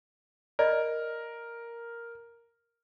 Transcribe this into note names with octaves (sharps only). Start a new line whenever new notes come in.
A#4 D5 D#5 B5